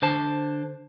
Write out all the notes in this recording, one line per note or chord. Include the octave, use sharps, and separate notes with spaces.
D3 C5 A5